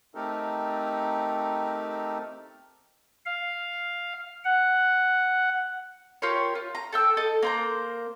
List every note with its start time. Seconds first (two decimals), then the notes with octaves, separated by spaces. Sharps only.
0.15 A3 C4 D#4 G4 A4 A#4
3.26 F5
4.44 F#5
6.22 F4 G4 A#4 C#5
6.55 F4
6.75 A#5
6.92 A4 G5 E6
7.17 A4 D#5
7.43 A#3 C5 A#5